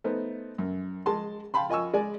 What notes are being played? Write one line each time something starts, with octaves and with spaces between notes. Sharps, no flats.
A3 B3 D#4 C5
F#2
G#3 A5 C6
F5 G5 A5 B5 C6
F4 D#5 G#5 C#6 E6
G#3 D5 G#5